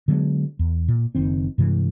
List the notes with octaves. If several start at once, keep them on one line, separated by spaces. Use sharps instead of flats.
D3 F#3 G#3 B3
E2
A#2
F#1 D#3 C4
G2 C3 E3 G#3